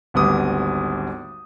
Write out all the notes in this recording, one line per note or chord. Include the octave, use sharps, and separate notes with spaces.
G#1 D2 G3 B3 D6 D#6